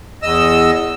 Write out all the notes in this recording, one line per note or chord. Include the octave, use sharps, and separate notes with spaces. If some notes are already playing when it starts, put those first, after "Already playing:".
E2 D#5 E6